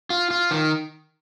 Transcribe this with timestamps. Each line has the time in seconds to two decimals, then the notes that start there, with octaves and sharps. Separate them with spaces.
0.10 F4
0.31 F4
0.51 D#3